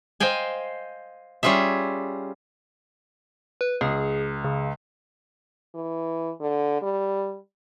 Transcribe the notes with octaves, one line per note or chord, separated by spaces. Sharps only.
C5 D#5 F5 G5 G#5
G3 C#4 F4 G#4 E5
B4
C#2 G#4
C#3
E3
D3
G3